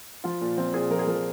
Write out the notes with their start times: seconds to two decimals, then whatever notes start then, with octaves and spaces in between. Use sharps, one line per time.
0.24 F3 F4
0.41 A#2
0.57 F3 C4
0.74 A#2 G#4
0.90 F3 A#4
0.99 G#4
1.07 F3 A#4